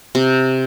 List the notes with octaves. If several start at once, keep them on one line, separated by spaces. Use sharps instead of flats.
C3